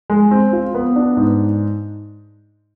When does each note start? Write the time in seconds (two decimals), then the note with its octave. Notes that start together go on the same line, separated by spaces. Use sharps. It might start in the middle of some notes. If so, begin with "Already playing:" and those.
0.10 G#3
0.31 C4
0.53 F4
0.74 B3
0.96 D4
1.17 G#2